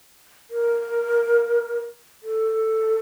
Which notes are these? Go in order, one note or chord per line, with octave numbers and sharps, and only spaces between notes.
A#4
A4